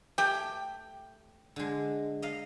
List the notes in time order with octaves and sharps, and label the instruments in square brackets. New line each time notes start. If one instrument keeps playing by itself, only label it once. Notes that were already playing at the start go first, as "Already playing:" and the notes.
[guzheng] A3 G#5 [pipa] G4 G5
[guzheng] D3 G#3
D#5 F5 A#5